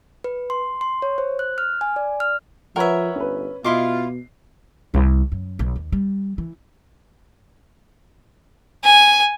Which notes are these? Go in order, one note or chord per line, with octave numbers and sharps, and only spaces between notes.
B4
C6
C6
C#5
C5
F#6
F6
G#5
D5
F6
F3 A#4 B4 C#5 E5 F#5
G1 C#4 B4
B2 E4 F4 D#5 C6 D6 C7
C2
F#2
B1
D#2
G3
E3
G#5